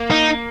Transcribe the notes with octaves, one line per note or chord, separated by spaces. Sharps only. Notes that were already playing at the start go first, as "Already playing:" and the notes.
Already playing: A#3
D#4